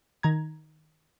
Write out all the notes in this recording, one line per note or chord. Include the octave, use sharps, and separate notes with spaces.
D#3 A#5 G#6